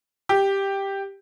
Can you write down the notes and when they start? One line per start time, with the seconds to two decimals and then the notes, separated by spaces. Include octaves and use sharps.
0.29 G4